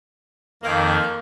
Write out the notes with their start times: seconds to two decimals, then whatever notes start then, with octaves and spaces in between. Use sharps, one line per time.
0.63 F2 D#3 A#3